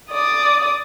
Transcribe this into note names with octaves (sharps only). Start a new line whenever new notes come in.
D5 D#6